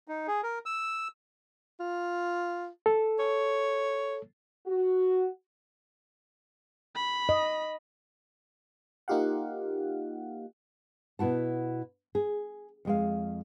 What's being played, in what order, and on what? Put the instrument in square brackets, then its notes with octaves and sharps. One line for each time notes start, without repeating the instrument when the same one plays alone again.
[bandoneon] D#4
G#4
A#4
E6
[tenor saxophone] F4
[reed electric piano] A4
[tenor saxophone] C#5
[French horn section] F#4
[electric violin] B5
[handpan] D#5
[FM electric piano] A#3 D#4 F4 G4 F5 F#5
[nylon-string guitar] B2 B3 E4 F#4 A5
G#4
F2 G#3 F5